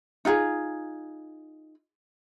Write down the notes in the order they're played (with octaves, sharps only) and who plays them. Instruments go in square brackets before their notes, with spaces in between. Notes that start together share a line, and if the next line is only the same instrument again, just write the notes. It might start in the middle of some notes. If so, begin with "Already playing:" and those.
[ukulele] D#4 F4 G4 G#4